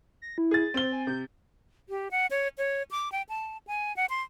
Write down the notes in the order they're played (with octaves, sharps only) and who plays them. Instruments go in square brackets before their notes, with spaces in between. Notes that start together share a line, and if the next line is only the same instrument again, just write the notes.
[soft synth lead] A#6
E4
[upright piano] G#4 A6
[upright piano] C4 G7 [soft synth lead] C5
[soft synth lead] G#5
[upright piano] C3 [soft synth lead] G6
[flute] G4
F#5
C#5
C#5
D6
G5
A5
G#5
F#5
C6